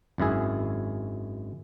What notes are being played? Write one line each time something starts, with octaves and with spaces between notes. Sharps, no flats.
G#1 F#2 E4 G#4